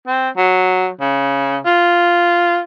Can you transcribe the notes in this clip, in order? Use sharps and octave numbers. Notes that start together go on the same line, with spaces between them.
C4
F#3
C#3
F4